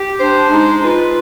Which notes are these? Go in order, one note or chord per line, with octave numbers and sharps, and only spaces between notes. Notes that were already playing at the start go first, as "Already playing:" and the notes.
Already playing: G4
D4 C5
G#3 D#4
F4 B4